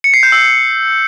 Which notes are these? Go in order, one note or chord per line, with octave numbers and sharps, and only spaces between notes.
C#7
C7
G6
E6